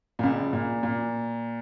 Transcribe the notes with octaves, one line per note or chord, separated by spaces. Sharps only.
A#2
C#2 C#3
A#2
A#2